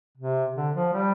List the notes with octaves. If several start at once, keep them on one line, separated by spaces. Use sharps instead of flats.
C3
D3
F3
G3